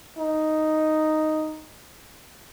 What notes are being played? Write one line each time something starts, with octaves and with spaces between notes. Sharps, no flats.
D#4